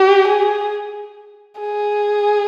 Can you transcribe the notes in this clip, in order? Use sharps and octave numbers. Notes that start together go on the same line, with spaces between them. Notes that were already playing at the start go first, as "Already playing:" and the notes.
Already playing: G4
G#4
G#4